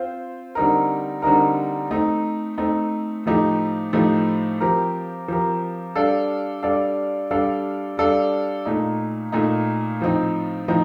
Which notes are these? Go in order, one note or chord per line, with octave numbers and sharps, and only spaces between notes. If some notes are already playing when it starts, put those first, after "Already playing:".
Already playing: C4 F4 C5
D3 G3 C4 D#4 A#4
D3 G3 C4 D#4 A#4
A3 C4 D#4
A3 C4 D#4
A2 F3 A3 D#4 G4
A2 F3 A3 D#4 G4
F3 C4 G4 A#4
F3 C4 G4 A#4
G3 D4 A4 D5 F5
G3 D4 A4 D5 F5
G3 D4 A4 D5 F5
G3 D4 A4 D5 F5
A#2 A3 D#4
A#2 A3 D#4
A2 F3 C4 D#4
A2 F3 C4 D#4